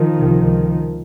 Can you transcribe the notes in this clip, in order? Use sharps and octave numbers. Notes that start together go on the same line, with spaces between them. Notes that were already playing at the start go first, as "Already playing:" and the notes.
Already playing: D#3 F3
C#2 C3